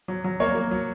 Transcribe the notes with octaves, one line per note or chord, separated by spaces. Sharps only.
F#3
F#3
A#3 C#5
A#3
F#3